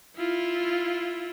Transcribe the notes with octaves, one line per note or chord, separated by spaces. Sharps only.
E4 F4